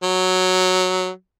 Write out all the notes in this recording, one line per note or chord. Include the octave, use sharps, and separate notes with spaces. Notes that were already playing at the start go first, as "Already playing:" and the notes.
F#3